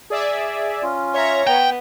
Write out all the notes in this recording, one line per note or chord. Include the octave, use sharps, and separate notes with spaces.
G#4 D5 E5
C#4 F4
C#5 E5 A#5
B3 G5